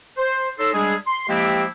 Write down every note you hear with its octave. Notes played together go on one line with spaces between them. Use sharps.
C5
D#4 A4 C#5 C6 E6
G3 G#3 D4 E4 G#4
C6
F3 G#3 A#3 C4 E4 G4